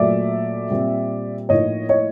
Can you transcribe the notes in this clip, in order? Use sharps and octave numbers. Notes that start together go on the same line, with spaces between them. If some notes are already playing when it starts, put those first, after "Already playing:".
Already playing: A#2 F#3 A3 D5 E5
A#2 G3 C4
A2 F3 A#3 D#4 C#5 D#5
C#5 D#5